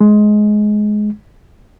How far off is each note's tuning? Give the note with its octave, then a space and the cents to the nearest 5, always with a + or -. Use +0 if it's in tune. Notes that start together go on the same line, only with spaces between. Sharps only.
G#3 +15